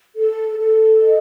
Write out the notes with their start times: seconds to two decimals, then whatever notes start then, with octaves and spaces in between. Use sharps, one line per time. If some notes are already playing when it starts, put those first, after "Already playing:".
0.16 A4
0.58 A4
1.01 D#5